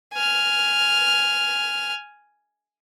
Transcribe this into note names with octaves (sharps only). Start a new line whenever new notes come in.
G#5 F6